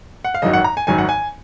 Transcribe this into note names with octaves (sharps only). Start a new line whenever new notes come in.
F#5
F5
G#1 F#2 D#3 F#3 D#5
F#5
A#5
G#5
G#1 F#2 D#3 F#3 G#5
F#5
G#5